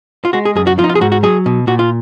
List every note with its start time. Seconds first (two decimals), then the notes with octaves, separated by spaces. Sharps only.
0.25 F4
0.33 G#3 F#4
0.45 G#4
0.56 F#2 G#4
0.67 F#4
0.78 F3 F4
0.84 D#4
0.89 F4
0.95 G#4
1.01 G#2 F#4
1.12 F#4
1.23 F#3 G#4
1.46 B2
1.67 A#2 F#4
1.79 F4